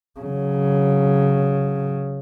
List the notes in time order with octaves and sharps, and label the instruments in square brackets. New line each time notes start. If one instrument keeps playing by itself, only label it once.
[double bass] C#3 F#3